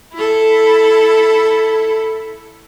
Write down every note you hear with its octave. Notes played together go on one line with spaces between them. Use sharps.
E4 A4